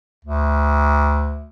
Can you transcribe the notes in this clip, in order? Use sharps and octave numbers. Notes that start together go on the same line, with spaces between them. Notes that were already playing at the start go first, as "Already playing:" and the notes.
D2